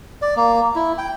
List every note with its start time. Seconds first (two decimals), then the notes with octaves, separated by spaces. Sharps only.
0.22 D5
0.36 A#3
0.76 E4
0.98 G5